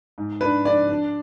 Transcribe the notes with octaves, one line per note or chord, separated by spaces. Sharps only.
G#2
D4 B4
D4 D5
D4